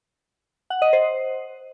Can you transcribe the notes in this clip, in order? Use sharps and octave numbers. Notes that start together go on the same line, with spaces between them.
F#5
D#5
C5